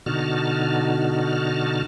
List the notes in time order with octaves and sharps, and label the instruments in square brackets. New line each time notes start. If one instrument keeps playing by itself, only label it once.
[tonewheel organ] B2 D3 D#4 F#4 A5 F6